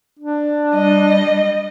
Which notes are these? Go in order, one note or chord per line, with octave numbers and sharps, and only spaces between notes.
D4
G3 D#5